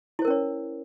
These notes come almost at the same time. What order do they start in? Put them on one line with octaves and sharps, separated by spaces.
E4 C5 A#4 C#4 C#5